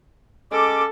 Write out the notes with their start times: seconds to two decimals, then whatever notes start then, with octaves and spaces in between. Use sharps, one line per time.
0.52 G#3 C#4 A4 D6